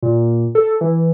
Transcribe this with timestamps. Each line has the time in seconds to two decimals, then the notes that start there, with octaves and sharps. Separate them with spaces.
0.03 A#2
0.55 A4
0.81 E3